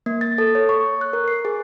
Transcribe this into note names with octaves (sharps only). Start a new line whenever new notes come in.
A#3
A6
A4
C#5
C#6
F#6
A#4
C7
G#4